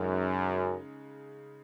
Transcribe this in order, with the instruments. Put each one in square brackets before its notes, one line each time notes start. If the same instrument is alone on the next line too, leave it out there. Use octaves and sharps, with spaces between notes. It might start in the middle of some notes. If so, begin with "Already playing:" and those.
Already playing: [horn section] F#2 [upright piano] C#3 G#3 D#4